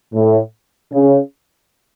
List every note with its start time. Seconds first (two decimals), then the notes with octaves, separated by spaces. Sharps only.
0.14 A2
0.93 C#3